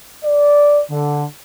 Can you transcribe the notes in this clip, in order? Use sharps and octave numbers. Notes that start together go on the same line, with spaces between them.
D5
D3